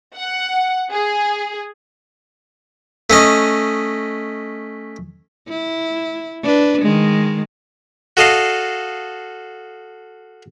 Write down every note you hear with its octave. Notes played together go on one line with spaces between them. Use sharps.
F#5
G#4
A3 C#4 D#5
E4
D4 B4
D#3 G#3
F#4 A4 D#5 F5